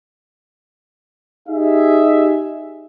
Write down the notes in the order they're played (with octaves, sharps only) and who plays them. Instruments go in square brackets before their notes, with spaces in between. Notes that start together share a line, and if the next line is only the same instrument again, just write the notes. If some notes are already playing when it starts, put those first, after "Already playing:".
[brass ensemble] D#4 G4 G#4 E5